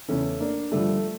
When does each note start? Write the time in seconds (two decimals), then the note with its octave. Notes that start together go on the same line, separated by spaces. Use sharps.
0.08 E2 C#3 E3 A3 C#4
0.40 A#3 D4
0.71 G2 D3 F3 A3